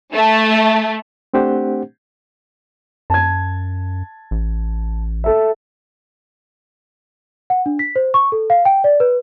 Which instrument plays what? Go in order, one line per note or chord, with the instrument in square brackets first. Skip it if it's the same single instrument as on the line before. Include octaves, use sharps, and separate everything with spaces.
[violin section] A3
[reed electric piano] A3 C4 D4 G4 C5 F#5
[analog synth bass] F#2 [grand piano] A5 G#6
[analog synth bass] A1
[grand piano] A4 E5
[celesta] F#5
D4
B6
C5
C#6
A4
F5
G5
D5
B4